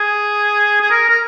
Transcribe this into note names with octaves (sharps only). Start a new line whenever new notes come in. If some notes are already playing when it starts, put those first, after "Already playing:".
Already playing: G#4
G#4
A#4
A#4